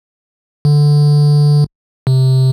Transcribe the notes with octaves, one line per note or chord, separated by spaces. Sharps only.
D3
C3